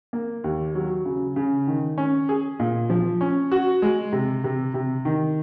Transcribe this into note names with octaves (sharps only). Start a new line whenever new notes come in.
A#3
D#2
F#3
C#3
C#3
D#3
C#4
G#4
A#2
F3
C#4
F#4
G#3
C3
C3
C3
D#3